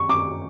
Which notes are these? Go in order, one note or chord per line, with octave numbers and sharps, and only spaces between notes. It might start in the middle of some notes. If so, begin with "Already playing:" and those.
Already playing: C#6
D6